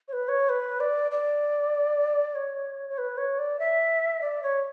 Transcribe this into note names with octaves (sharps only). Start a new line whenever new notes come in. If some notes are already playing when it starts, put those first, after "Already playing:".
C#5
B4
C#5
B4
D5
D5
C#5
C#5
B4
C#5
D5
E5
D5
C#5